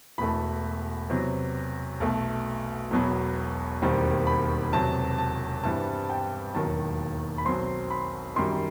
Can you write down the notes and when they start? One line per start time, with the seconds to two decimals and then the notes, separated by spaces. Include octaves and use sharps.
0.18 E1 E2 B2 A3 B5
1.09 E2 C3 F#3
2.00 B1 B2 A3
2.91 E1 E2 B2 F#3 B3
3.82 E1 D#2 D#3 G3 C4
4.27 B5
4.72 E1 E2 C3 F#3 A5
5.18 A5
5.64 G2 E3 G3 C4 A5
6.10 G5
6.55 E1 D#2 D#3 F#3 A5
7.38 B5
7.45 B1 B2 F#3 C4 C6
7.90 B5
8.36 F#2 D#3 G3 C6